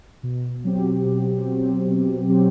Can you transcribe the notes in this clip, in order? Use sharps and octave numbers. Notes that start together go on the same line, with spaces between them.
B2
F#3 C4 G4
B2
F#3 C4 G4
B2
F#3 C4 G4